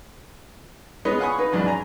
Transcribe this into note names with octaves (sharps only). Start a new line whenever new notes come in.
G#3 B3 B4 C#5 D#5
F5 F#5 G#5 B5 C#6 D#6
D#4 B4
E2 G#2 F#3 C#4 D4
G#5 A#5